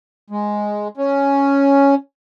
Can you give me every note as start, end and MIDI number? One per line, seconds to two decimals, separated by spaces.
0.30 0.88 56
0.97 1.95 61